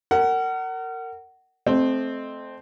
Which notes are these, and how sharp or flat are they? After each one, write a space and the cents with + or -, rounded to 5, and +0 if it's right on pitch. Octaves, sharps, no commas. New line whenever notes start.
A#4 -25 F#5 +20
A3 -20 C4 +0 D#5 -30